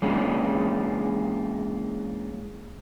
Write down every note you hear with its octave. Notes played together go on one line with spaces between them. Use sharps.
E3 G#3 A#3 C#4 D4